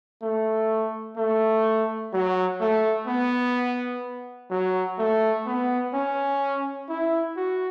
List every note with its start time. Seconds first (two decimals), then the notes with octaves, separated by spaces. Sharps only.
0.22 A3
1.17 A3
2.13 F#3
2.60 A3
3.07 B3
4.50 F#3
4.98 A3
5.46 B3
5.93 C#4
6.89 E4
7.36 F#4